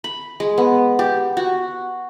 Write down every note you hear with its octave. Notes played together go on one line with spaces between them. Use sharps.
B5
G#3
B3
G4
F#4